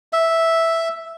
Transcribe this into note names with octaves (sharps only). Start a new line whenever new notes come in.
E5